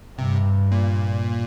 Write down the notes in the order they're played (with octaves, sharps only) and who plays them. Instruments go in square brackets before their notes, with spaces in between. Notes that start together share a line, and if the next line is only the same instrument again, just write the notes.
[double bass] G2 [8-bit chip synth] C3
[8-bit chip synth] A#2